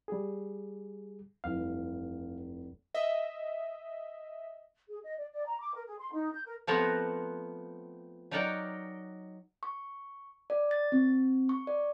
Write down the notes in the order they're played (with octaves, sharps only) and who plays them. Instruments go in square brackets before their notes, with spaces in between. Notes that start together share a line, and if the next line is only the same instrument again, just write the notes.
[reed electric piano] G3 G#4
[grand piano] F1 G2 E3 [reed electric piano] F5
[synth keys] D#5 E5
[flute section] G#4
D#5
D5
D5
A#5
D6
A#4
G#4
C6
D#4
G6
A#4
[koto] F3 A3 B3 C4 F#5 A#5
F#3 D#4 A#4 D5 F#5 G5
[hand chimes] C#6
D5
A6
C4
C#6
D5